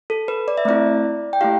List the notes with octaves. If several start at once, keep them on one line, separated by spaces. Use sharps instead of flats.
A4
B4
D5
E5
A3 C4 E4 D5
G5
A3 E4 G4 F5